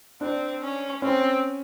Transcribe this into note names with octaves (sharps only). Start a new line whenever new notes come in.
C4 D4
C#4
C4 C#4